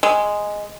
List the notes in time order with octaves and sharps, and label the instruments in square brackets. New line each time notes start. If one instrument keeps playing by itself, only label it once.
[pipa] G#3